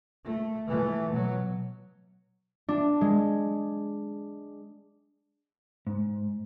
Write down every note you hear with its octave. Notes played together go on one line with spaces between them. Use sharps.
A3
E3 A3
B2 F#3
D4
G#3
G#2